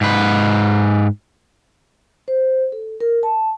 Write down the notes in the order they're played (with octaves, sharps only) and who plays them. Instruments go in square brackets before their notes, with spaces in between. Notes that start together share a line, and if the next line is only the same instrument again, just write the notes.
[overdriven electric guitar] G#2 B4
[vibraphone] C5
A4
A#4
A5